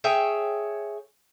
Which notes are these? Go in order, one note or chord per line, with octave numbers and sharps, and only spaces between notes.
G#4 C#5 E5 G5